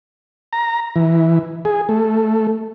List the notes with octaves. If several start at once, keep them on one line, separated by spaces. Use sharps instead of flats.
A#5
E3
G#4
A3